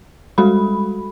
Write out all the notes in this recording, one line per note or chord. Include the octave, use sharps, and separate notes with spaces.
G3 G#3 F#4 A4 B5